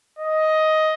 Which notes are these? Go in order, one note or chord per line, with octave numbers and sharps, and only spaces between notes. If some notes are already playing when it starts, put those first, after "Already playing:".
D#5